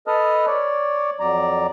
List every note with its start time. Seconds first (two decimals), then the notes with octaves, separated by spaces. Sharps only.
0.07 A4 B4 D#5 A5 D#6 F6
0.47 C#5 D5
1.20 F2 F#3 D5 A#5